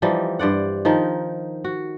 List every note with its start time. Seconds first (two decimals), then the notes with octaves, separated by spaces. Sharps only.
0.02 E3 F3 G3 D#4
0.39 G2 C5 D5 F#5
0.85 D#3 F3 D#4
1.64 F#4